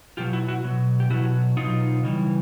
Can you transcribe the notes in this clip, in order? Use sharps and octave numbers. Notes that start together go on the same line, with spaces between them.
B2 F#3 F4 G4
E4 F#4
E4 F#4
B2 F#3
G4
B2 F#3 E4 F#4
B2 F#3 D#4 F4
C#3 E3 G3